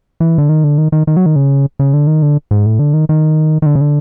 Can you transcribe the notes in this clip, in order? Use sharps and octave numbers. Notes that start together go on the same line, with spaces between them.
E3
D3
D#3
D3
D#3
D#3
D#3
F#3
D#3
C#3
C#3
D3
D#3
D3
G#2
A2
D3
D#3
D#3
D#3
D3
C#3
D3